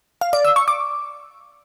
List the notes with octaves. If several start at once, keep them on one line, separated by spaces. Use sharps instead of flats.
F5
D5
E6
C#6
D6